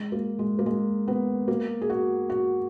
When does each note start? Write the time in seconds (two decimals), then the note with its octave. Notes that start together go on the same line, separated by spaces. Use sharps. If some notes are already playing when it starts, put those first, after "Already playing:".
Already playing: G#3
0.12 A#3
0.39 G#3
0.59 A#3
0.66 G#3
1.08 B3
1.48 A#3
1.82 G#4
1.90 F#4
2.30 F#4